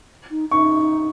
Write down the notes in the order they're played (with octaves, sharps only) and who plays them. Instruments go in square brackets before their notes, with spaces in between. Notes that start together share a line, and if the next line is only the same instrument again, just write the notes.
[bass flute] D#4
[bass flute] D#4 [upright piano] C#6